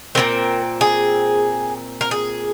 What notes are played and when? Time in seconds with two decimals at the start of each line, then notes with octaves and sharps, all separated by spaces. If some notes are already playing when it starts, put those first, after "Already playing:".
0.15 A#2 G#3 C4 A#4
0.81 G#4
2.01 A#4
2.11 G#4